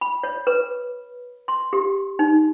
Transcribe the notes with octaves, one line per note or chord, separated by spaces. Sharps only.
B5
C#5
B4
C6
G4
D#4